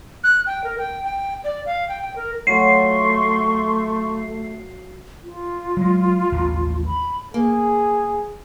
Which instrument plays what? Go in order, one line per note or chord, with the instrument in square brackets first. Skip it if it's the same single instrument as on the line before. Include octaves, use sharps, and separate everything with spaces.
[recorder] F#6
G5
A#4
G5
G5
D5
F5
G5
G5
A#4
[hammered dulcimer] F#3 F4 [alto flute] A3 [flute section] C6 C#6 [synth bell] C7
[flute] F4
[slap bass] F#3 G#3
A1 D#2
[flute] B5
[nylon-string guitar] A#3 [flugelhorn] G#4